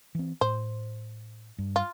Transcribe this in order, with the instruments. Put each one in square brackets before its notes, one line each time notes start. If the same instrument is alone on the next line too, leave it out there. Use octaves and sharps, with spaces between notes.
[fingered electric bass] E3 C4
[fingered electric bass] A2 [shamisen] C5
[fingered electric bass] G2
[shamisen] F4